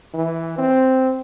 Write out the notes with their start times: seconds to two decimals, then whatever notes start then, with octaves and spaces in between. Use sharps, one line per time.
0.14 E3
0.58 C4